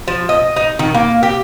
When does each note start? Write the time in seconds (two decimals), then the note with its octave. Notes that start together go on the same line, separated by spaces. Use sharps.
0.08 F3
0.29 D#5
0.56 D#4
0.79 D#3
0.94 A#3
1.23 G4